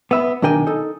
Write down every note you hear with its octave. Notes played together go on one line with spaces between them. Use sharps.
B3 E5 B5
B1 D#3 D4 A#4 G5 G#5
D#4 A4